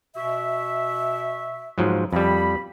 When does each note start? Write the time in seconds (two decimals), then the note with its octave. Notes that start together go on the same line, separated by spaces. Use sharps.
0.16 B2 F#4 E5
1.78 G#2 F3 F#3
2.13 F2 G3 B5